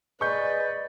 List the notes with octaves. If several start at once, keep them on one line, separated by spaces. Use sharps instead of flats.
G#3 B4 D5 C#6 G6